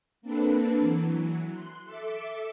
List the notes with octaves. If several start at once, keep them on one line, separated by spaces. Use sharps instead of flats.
A#3 C4 D4 A4 B4
E3 F#3
C6 F#6
A4 E5 D6